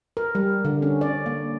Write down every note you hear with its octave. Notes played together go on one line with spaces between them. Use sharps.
A#4
G3
D3
C#4
D5
A#3